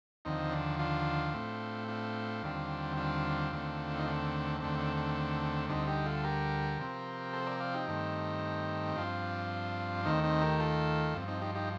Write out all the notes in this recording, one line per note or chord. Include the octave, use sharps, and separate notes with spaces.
D#2 D3 F3 C4 D#4
D4
D4 F4
A2 A3 C4
D4 F4
D#2 D3 G3 C4
D4 F4
D#2 D3 A3 C4
D#4
D4
D#2 D3 A3 C4 D4
D4
D4
D2 D3 G3 C4 D#4
D#4 G4
F4 A4
G4 A#4
C3 F3 C4
A4 C5
A#4 D5
D5 F5
D#4 G4
G2 D#3 A3 C4
G2 F3 C4 D4 F4
D#2 D#3 A3 C4 D#4
C4 D#4
G4 A#4
F4 A4
G2 F3 C4
C4 D#4
D#4 G4
D#4 G4